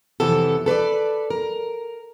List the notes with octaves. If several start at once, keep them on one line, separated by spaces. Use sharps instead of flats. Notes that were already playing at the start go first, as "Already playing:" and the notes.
F2 C3 E3 B3 A4
A4 B4 C#5 D5
A#4